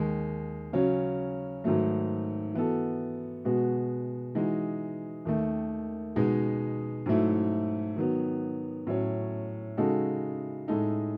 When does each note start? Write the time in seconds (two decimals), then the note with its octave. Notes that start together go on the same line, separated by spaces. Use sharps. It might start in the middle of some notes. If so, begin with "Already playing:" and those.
Already playing: D#2 D#3 G#3
0.73 C#3 F#3 C#4
1.64 G#2 D#3 F#3 A3
2.54 E3 B3 F#4 A4
3.45 B2 G#3 B3 F#4
4.35 E3 G#3 D#4 F#4
5.25 D#2 D#3 A3
6.16 B2 G#3 B3 D#4 G#4
7.06 G#2 F#3 A3 E4
7.96 D#3 F#3 B3
8.87 A2 F#3 C#4
9.77 C#3 G#3 D#4 F#4 A4
10.68 A2 G#3 D#4 A4